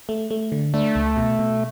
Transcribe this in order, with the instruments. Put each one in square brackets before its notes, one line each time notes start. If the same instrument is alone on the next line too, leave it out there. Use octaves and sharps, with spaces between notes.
[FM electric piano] A3
A3
D3
[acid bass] A3 [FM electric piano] D4
[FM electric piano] C#2
B2
B2